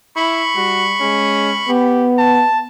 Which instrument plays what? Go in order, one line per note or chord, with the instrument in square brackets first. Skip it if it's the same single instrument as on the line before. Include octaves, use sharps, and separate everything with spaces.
[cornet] E4 [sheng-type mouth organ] B5 C#6
[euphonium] G3 [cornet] F#4
[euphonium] G#3 [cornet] C#4
[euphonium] B3 [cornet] G4
[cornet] A5